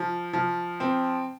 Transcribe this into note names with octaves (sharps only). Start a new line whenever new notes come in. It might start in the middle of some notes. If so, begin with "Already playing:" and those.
Already playing: F3
F3
C4